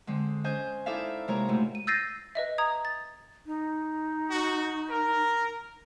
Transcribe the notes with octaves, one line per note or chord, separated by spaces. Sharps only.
D3 G#3 C4
C#4 C5 D#5 G#5 G6
D#4 E4 A4 D5 E5 F5
C3 G#3 A#3 A#4 C#5 A#5
G#2 B2 A3
D#7
E6 G6 A6 A#6 C7 D#7
B4 D#5 E5
A#5 D#6 G#6
A6
D#4
F#4
A#4